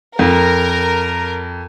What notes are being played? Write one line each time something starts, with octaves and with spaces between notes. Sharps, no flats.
F2 A#4